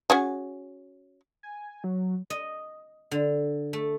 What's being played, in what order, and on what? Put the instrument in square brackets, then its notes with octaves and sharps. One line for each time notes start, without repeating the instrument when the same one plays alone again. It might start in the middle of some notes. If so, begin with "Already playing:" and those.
[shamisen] C#4 F#4 G#4
[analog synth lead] G#5
F#3
[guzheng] D#5
D3
A3